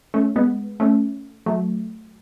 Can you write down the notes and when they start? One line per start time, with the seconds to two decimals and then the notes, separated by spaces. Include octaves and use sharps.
0.14 A3 C#4
0.36 G#3 B3
0.80 A3 C#4
1.46 F#3 A3